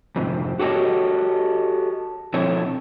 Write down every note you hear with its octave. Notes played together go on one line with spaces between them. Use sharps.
F2 G#2 C3
F#4 G4 A4 C#5 D#5
B2 F3 C4 E4 A4 C#5